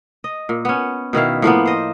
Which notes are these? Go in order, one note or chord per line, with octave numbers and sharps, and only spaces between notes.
D#5
A#2
B3 C#4
B2 D#3 E4 F5
A2 F3 A#3 B3
C5 D#5